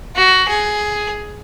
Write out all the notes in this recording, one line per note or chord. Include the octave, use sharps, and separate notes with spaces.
F#4
G#4